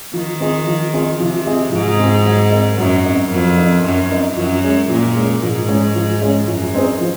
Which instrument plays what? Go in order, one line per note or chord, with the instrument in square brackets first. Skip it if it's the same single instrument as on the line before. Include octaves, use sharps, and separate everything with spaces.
[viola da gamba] D#3 [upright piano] F3
[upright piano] C4 F4 G#4 D#5
F3
C4 F4 G#4 D#5
[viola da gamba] C3 [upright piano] F3
[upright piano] C4 F4 G#4 D#5
[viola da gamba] G#2 [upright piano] F3
[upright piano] C4 F4 G#4 D#5
F#3
C4 D#4 A#4 D#5
[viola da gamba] F#2 [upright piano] F#3
[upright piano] C4 D#4 A#4 D#5
[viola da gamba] F2 [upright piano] F#3
[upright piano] C4 D#4 A#4 D#5
[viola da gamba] F#2 [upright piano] F#3
[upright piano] C4 D#4 A#4 D#5
[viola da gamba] F#2 [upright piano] F3
[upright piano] G#3 C#4 G#4
[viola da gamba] A#2 [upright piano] F3
[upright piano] G#3 C#4 G#4
[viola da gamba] G#2 [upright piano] F3
[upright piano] G#3 C#4 G#4
F3
G#3 C#4 G#4
[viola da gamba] F#2 [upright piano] F3
[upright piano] C4 D#4 G#4 C5
F3